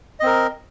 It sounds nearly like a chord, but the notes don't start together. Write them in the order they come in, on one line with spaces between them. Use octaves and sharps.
D#5 C4 A#4